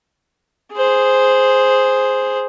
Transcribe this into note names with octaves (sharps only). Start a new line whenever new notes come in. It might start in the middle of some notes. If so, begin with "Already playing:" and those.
G#4 C5